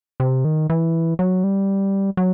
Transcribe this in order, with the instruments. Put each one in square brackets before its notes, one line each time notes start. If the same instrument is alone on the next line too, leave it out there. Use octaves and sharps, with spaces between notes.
[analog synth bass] C3
D#3
E3
F#3
G3
F#3